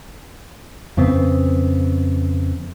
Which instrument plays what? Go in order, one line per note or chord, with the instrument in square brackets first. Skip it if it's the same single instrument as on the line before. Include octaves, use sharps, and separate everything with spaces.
[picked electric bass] F2 C#3 B3 C4